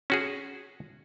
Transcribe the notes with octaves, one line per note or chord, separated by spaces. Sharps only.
C#4 F#4 G#4